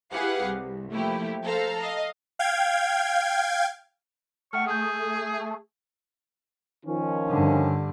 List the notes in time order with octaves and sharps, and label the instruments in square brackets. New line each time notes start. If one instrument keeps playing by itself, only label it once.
[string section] E4 G4 G#4 B4 F5 F#5
C2
F3 A3 A#3 E4 G4
A4 C5 F5 A#5
D#5 F5
[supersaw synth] F5 G5 G#6
[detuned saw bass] A3 [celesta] F#5 G5 F6 [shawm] C#6
[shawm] G#4 [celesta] D#6 G6
[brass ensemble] D#3 F3 C#4
[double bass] G2 D3